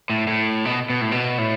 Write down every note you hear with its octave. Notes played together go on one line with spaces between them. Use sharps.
A2
A2
B2
B2
A2
B2
A2